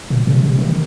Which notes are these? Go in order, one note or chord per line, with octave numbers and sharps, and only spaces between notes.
A#2
C3
C3
D#3